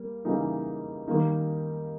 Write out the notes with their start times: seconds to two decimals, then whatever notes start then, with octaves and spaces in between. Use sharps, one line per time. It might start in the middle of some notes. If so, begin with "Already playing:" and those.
Already playing: G3 A#3
0.25 C#3 E3 G3 A#3 D#4
1.08 D#3 G3 A#3 D#4